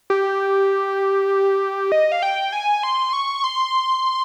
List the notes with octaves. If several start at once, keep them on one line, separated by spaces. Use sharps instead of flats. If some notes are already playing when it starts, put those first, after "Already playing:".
G4
D#5
F5
G5
G#5
C6
C#6
C6